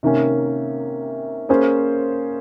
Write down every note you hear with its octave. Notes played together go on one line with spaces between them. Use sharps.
C3 D#3 A#3 C#4
A#3 C#4 G#4 C5